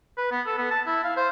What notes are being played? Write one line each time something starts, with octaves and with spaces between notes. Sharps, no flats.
B4
B3
A4
B3
A5
E4
F5
C5